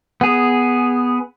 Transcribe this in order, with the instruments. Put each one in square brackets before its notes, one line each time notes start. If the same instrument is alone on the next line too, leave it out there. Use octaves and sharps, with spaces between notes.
[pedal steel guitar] B3 G#4